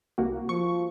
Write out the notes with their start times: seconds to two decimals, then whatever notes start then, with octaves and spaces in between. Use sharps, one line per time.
0.18 C2 A#3 F#4
0.49 F3 C#6